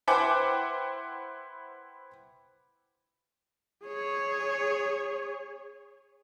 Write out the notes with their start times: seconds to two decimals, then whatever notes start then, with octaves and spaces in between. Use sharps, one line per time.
0.07 E4 B4 C5 F#5 G5 D6
3.85 G#4 C#5